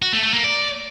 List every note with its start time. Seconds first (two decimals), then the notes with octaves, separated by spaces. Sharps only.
0.02 F#4
0.13 A3
0.23 A3
0.34 A#3
0.44 D5